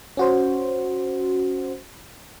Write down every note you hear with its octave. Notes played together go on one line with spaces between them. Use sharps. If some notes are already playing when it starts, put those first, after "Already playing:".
C#4 F#4 C5